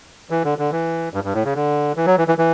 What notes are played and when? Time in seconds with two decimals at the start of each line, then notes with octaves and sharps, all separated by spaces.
0.30 E3
0.44 D3
0.58 D3
0.72 E3
1.14 G2
1.24 G2
1.34 A2
1.44 C#3
1.55 D3
1.97 E3
2.06 F#3
2.17 E3
2.28 E3
2.38 E3